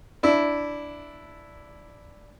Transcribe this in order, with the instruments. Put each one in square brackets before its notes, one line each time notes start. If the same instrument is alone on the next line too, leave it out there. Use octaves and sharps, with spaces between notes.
[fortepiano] D4 E4